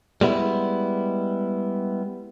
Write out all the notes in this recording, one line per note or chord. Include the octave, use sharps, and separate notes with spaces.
G3 G#3 B3 E4